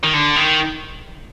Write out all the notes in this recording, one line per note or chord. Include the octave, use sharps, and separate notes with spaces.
D#3
D3
D#3